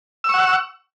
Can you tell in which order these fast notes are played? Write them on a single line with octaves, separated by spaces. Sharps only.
E6 C#6 F#5